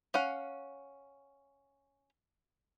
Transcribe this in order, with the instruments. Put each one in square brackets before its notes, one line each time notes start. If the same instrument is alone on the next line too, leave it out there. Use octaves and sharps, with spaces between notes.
[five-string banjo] C#4 F5 F#5